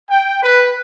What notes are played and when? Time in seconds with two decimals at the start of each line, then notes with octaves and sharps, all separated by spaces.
0.11 G5
0.42 B4